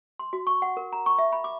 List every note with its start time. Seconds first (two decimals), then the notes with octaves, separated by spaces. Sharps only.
0.19 C6
0.33 F#4
0.47 C#6
0.62 F#5
0.77 A#4
0.93 A#5
1.06 C#6
1.18 E5
1.32 B5
1.44 D6